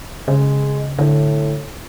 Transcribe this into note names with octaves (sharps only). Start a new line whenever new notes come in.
C#3 G#3
A2 D3